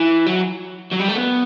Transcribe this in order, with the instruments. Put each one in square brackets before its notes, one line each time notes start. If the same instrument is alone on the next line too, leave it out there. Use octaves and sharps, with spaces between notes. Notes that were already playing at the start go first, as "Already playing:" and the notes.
Already playing: [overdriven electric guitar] E3
F#3
F#3
G3
A3
B3